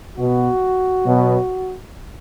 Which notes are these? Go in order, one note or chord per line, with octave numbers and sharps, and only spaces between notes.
B2 B3 F#4
B2 F#3 B3